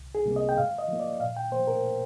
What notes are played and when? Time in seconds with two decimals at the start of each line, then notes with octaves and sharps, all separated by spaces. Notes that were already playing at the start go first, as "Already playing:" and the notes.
Already playing: C2
0.15 G#4
0.26 C3 G3 A#3
0.36 D#5
0.49 G5
0.58 G#2 F5
0.78 D#5
0.88 F3 A#3
1.00 D5
1.20 A#2 F5
1.37 G5
1.52 F3 A#3 C5
1.67 A#4